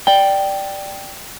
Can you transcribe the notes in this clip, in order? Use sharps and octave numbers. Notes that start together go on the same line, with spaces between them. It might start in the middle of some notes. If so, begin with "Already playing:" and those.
D5 G5